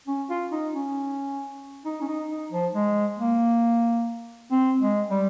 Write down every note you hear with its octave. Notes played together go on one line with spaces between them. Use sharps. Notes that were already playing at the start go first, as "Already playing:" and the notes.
C#4
F4
D#4
C#4
D#4
C#4
D#4
D#4
F3
G#3
A#3
C4
G#3
G3